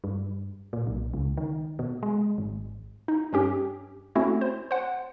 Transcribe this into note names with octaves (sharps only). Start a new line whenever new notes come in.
G2
A#2
B1
C#2
D#3
B2
G#3
G#1
D#4
G2 C#4 G4
A3 C4 C#4 E4 F#4
C5
C5 F#5